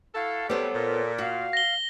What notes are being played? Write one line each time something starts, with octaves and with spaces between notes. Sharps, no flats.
E4 F#4 A4 F5
C3 F#3 G3 B3 A4 C5 C#5
A#2
F#4 F5
A#6 G7